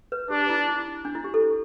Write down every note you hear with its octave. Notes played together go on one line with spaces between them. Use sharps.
B4
D4 G4
E4
E4
D4
E4
G4
A4